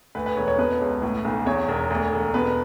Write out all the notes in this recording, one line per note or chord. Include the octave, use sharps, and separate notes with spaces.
D2 B4
B4
E1 C#5
C#5
B2 B4
C#2
A2
B1
E2 C#5
E1
D2
E1
B2 B4